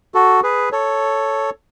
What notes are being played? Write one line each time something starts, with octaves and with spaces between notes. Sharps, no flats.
F#4 A4
G#4 B4
A4 C#5